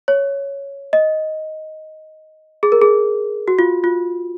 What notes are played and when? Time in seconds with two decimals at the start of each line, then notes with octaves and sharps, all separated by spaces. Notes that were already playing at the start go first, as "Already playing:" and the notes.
0.08 C#5
0.93 D#5
2.63 G#4
2.72 A#4
2.82 G#4
3.48 F#4
3.59 F4
3.84 F4